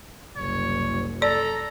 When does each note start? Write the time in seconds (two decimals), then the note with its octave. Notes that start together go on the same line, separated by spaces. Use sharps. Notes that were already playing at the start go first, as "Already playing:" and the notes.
0.36 F#1 C2 C#5
1.22 A4 D5 A#5